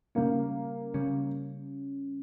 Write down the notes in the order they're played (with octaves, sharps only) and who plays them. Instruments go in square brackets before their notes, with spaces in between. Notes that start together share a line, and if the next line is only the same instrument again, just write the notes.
[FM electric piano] C#3 G3 C#4 [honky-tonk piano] A#3
[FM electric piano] C#3 G3 C#4